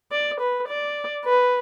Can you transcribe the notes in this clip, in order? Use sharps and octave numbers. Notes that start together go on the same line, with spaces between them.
D5
B4
D5
B4